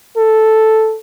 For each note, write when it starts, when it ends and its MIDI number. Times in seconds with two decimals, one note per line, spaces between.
0.17 0.97 69